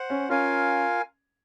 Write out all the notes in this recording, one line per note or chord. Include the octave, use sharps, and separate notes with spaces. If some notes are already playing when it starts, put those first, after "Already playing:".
Already playing: C5 F#5
C#4
C#4 F4 A#4 F5 G#5